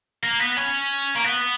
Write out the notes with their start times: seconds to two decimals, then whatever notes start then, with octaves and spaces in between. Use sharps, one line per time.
0.23 A#3
0.40 B3
0.57 C#4
1.16 A#3
1.24 B3